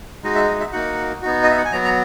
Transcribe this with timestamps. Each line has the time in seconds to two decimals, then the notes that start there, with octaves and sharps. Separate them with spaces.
0.23 G#3 D#4 F#4 D#5
0.35 E5
0.48 D#5
0.60 E5
0.73 A#3 D#4 F#4 F#5
1.22 B3 D#4 F#4
1.43 D#5
1.51 E5
1.58 F#5
1.65 G#5
1.72 F#3 B3 F#4 A#5
1.85 A#5